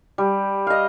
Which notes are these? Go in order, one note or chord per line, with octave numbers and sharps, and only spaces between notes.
G3
D#5 F5